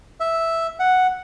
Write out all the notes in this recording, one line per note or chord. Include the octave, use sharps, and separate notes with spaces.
E5
F#5